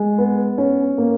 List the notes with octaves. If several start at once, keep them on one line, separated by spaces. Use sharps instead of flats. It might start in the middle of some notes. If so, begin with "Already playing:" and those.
Already playing: G#3
B3
C#4
A#3